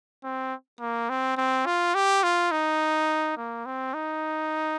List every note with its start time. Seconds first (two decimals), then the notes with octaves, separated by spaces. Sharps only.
0.24 C4
0.80 A#3
1.09 C4
1.37 C4
1.66 F4
1.95 G4
2.23 F4
2.51 D#4
3.37 A#3
3.66 C4
3.94 D#4